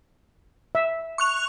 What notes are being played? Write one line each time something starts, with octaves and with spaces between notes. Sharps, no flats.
E5
C#6 F#6 F7